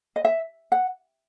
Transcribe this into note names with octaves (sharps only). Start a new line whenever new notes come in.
D#5
E5
F#5